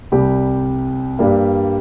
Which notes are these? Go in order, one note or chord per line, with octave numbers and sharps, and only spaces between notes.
C2 C3 G3 G4
G2 G3 A#3